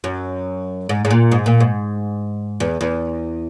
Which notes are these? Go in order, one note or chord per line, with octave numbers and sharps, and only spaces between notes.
F#2
G#2
G#2
A#2
G#2
A#2
G#2
E2
E2